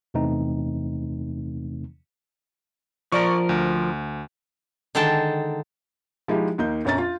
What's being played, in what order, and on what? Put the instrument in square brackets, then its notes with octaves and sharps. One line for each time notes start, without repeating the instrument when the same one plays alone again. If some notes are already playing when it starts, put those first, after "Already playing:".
[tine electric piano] E2 C3 E3 A3 C4 D#4
[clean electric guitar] F3 A#4 [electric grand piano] D5 C#6
[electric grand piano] D2
[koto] D3 D#3 G#3 G5 A5
[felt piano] F3 G#3 D#4 E4 G4
D#2 A#3 D#4 G6
A#1 F2 C#4 A#5 A6
F4